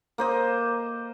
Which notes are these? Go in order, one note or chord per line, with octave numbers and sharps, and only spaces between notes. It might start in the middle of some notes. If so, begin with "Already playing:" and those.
A#3 C5 D#5